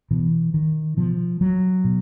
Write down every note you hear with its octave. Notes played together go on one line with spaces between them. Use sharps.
B2 E3
D#3
B2 F3
F#3
B2